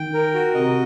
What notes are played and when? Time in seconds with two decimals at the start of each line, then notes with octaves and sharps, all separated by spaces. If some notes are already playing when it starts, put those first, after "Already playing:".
Already playing: D#3 G5
0.14 A#4
0.34 F#4
0.55 C3 D#5